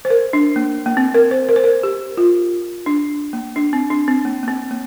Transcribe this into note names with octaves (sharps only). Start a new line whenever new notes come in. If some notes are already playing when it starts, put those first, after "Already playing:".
C5
A#4
D4
A#3
A#3
C4
A#4
C5
A#4
C5
A#4
G4
F4
D4
A#3
D4
C4
D4
C4
A#3
A#3
C4
A#3